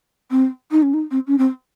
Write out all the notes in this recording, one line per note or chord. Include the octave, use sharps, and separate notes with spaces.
C4
D#4
C#4
D#4
C4
C#4
C4